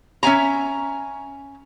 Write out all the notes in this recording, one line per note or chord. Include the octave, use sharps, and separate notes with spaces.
C#4 E5 G#5 A#5